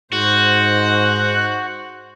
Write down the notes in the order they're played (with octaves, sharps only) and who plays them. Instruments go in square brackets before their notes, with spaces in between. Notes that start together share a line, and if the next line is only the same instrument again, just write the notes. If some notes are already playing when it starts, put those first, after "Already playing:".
[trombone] G#2 [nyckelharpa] D#4 C5 [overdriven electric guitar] F#4 [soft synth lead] F#6